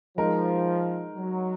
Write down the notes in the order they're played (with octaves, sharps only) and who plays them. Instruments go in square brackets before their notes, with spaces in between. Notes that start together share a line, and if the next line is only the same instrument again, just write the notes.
[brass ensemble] F3 [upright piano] G#3 D#4 A#4
[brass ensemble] F#3